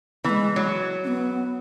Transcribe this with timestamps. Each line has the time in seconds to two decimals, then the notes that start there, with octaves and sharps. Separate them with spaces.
0.24 E3 G#3 B3
0.56 F#3
1.04 C#4
1.07 B3